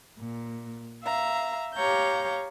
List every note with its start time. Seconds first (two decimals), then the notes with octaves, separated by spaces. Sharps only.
0.18 A#2
1.03 E5 F5 A#5
1.75 G4 C#5 F5 A#5 G6